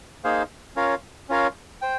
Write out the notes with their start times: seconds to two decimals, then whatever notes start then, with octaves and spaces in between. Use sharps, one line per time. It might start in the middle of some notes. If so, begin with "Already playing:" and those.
0.24 A#3 D#4 G#4 C5 F5
0.76 C#4 F4 A#4 C#5 F5
1.29 C#4 F4 A#4 C#5 F5
1.82 C5 G5